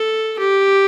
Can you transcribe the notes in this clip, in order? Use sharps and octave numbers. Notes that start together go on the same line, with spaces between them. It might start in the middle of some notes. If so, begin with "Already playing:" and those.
Already playing: A4
G4